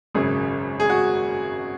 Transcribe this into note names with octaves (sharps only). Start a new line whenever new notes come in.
G#1 F#2 C#3 G#4
G#4
F#4